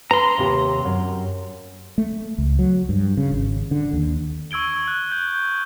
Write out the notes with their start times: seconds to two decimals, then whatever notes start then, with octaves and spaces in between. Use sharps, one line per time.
0.11 B4 A#5 C6
0.38 D#2 C3 G4
0.85 F#2
1.98 A3
2.38 C#2
2.59 F#3
2.89 G2
3.17 C#3
3.32 G#1
3.71 D3
3.93 D#2
4.51 C#6 E6 G#6 D7 G7
4.88 F#6
5.12 G6